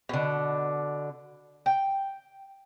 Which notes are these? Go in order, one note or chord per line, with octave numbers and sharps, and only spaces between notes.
B2 D3
G5